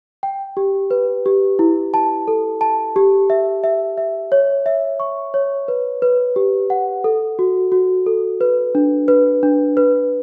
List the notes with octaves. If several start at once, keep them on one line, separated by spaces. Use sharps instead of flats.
G5
G4
B4
G4
E4
A5
A4
A5
G4
E5
E5
E5
C#5
E5
C#6
C#5
B4
B4
G4
F#5
A4
F#4
F#4
A4
B4
D4
B4
D4
B4